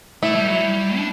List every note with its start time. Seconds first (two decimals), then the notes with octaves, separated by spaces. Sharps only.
0.23 A3 E4
0.35 G3
0.47 F#3
0.61 G3
0.97 D4